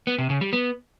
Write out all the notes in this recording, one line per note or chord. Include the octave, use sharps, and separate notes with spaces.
B3
C3
C#3
G3
B3